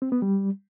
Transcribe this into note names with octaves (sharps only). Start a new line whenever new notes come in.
C4
B3
G3